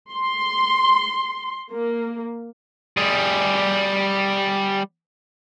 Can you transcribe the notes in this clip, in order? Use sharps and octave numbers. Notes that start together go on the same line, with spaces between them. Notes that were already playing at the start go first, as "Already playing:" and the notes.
C6
A#3
G3 G#4